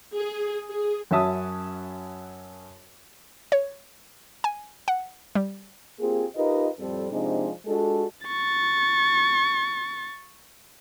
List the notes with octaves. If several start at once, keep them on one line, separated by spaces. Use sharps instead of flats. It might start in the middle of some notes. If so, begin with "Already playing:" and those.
G#4
G#4
F#2 C#4 F#4 E5 A5 D#6
C#5
G#5
F#5
G3
A#3 C4 F4 G4 G#4
D#4 F4 G4 A#4 B4 D#5
F2 A2 G3 C4 A4
C3 F3 G#3 C4 D4 D#4
G#3 D4 F4 F#4 A4
C#6 A6